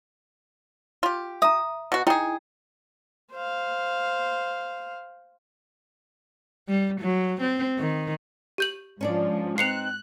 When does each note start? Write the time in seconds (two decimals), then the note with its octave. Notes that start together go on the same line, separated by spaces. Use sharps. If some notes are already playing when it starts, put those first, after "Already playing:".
1.03 F4 G4
1.42 E5 A#5 D#6
1.92 B2 F#4
2.07 D#4 E4 G#4 G5 A#5
3.33 C5 F5
6.68 G3
7.01 F#3
7.41 C4
7.79 D#3
8.58 G4 G6 F#7
9.01 G#2 F3 C#4 D4 D5
9.58 C4 D#4 C5 F#6 C7 C#7 F7